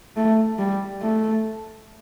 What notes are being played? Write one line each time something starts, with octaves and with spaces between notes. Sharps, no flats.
A3
G3
A3